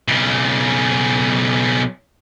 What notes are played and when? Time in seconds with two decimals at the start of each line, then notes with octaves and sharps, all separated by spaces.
0.08 B1 C#3